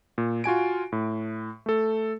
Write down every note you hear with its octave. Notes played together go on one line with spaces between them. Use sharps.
A#2
F4 F#4 G#5 D7
A2
A3 A4